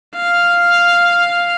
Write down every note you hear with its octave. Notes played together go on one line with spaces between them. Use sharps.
F5